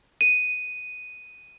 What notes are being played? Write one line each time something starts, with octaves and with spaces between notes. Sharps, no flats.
D#7